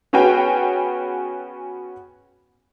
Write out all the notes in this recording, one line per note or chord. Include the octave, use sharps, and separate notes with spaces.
B3 C#4 F#4 G#4 G5